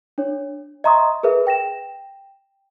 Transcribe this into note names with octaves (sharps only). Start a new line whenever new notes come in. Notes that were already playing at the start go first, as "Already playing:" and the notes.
D4 C#5
D#5 E5 A#5 C6 C#6 D#6
G#4 A#4 B4 E5
G5 A#6 E7